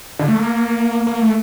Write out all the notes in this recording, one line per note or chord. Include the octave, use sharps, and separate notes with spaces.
D3
A3
A#3
A#3
A3